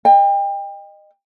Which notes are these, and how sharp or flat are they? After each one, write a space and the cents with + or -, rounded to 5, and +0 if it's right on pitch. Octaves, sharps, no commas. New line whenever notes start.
D#5 -20 G5 +30